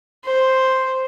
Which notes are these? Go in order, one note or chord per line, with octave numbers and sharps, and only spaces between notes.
C5